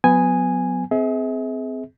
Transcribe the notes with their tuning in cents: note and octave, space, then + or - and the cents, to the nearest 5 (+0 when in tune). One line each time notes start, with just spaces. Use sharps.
F#3 -20 B3 +20 G#5 -5
C4 -25 G#4 +25 E5 -40